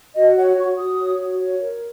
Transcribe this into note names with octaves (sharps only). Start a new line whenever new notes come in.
F#4 D#5
C#5 F#5
F#4 C#6
F#4 D#6
C#5
F#4
C#5
A#4